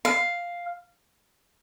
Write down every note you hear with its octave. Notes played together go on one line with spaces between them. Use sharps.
F5